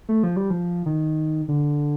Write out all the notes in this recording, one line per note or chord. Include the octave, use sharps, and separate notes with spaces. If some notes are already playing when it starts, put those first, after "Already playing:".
A3
F3
G3
F3
D#3
D3